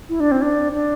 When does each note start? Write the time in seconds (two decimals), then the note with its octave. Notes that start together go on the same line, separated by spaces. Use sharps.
0.09 E4
0.20 D4
0.31 C4
0.42 D4
0.73 D4